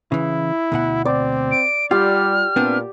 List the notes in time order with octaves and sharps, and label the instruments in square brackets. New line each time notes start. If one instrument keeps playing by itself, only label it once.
[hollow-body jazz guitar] C#3 E3 [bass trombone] E4
[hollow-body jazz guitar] D2 B2 F#5
[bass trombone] C4 [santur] D5
[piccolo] D7
[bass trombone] G3 [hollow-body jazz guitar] F4 [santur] G4 [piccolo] F6
[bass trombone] A#2 [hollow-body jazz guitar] B3 C4 D4